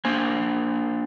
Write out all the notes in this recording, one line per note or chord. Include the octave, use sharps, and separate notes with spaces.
A#3 D4 C5 G#5